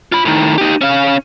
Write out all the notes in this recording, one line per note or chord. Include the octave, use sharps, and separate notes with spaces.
F4 B5
A2 D#3
D#4 G4
C#4 F5